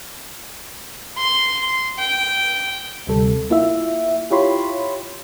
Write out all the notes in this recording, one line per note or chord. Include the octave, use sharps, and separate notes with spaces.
C6
G5
D2 C3 G3 A4
A#3 E4 F4 E5
E4 F4 G4 C#5 B5 C6